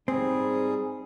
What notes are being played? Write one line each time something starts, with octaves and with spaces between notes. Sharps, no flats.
G#2 G3 C4 G#4